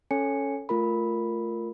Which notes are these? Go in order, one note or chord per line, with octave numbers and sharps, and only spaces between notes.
C#4 A4 C#5 G#5 C#7
A3 F4 A#4 B5